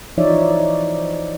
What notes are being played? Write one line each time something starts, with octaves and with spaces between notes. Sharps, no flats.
E3 F3 D#4 C#5 D5 E5